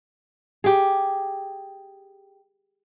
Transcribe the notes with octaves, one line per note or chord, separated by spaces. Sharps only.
G4 G#4